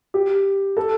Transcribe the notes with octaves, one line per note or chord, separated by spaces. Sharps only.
G4
A4